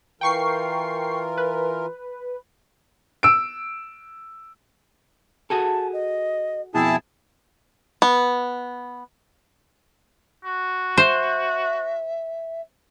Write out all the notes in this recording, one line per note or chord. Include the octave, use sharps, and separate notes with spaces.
E3 F4 A#4 G5 C#6 C7
B4
E6 D7
F#4 G#4 A4 A5
D#5
F2 B2 E4 G#4 G5 A5
B3
F#4
C5 E5